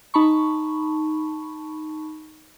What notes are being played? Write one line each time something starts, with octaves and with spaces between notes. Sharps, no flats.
D#4 A5 B5 C#6